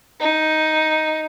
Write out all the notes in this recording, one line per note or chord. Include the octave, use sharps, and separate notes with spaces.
D#4